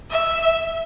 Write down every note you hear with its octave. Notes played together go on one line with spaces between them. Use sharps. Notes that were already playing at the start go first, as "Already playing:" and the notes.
E5